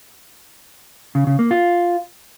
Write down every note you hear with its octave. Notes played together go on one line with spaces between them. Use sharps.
C#3
C#3
A#3
F4